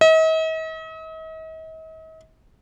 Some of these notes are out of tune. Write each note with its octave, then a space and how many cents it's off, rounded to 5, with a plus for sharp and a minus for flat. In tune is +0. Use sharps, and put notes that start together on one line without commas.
D#5 +45